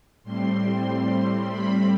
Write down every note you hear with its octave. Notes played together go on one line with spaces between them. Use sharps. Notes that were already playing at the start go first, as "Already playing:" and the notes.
A2 G3 C4 C6
B5